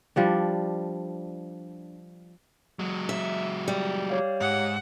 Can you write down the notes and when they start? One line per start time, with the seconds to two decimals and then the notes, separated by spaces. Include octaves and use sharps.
0.16 F3 G3 D4
2.79 F#3 G#3
3.09 E5
3.68 G3
4.10 G4 C#5 F5
4.41 G#2 F#5